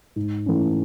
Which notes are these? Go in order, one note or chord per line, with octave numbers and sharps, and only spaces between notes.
G#2
E3 A3 C#4